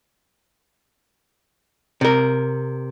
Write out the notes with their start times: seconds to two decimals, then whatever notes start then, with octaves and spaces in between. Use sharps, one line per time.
2.01 C3 A#4